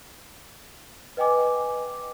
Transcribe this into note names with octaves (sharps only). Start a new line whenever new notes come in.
B4 D#5 G5 G#5 D6